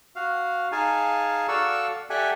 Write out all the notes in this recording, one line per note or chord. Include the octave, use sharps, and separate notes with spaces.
F#4 F5
D#4 G#4 F5 G#5 A5
F#4 A4 D5 F5 C#6 E6
G4 A4 D5 E5 F#5 G#5